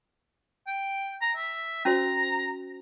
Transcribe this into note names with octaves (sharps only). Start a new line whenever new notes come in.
G5
A#5
E5
C#4 F#4 C5 A#5